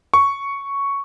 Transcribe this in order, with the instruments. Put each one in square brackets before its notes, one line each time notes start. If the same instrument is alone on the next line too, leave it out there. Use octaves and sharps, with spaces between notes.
[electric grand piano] C#6